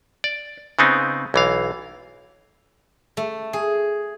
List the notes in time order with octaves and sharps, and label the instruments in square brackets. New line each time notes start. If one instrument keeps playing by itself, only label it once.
[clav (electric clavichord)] D5
C#3 B3 C4 D#4
B1 E3 F5
[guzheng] A3
G#4